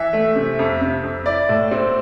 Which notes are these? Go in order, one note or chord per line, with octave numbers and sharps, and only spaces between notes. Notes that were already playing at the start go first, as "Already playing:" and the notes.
Already playing: E3 E5
A3
C3
F2
C3
F2
E4 D5
A2
C4